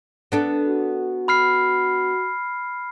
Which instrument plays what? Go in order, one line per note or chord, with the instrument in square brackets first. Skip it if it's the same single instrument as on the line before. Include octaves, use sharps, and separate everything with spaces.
[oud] B3 D4 A4
[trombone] F#4
[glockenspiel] B5 F6 C7